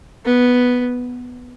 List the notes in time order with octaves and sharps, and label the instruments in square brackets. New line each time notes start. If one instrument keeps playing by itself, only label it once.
[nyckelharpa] B3